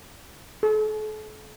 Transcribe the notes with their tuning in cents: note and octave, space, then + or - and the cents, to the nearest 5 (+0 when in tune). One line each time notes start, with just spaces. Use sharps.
A4 -40